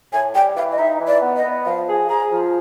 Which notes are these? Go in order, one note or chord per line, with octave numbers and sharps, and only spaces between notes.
A2 G#5
G3 G5
E3 F5
D#5
D#4 E5
E3
D5
B3
D#5
B3
F3 F5
G#4
G#4 A#5
F3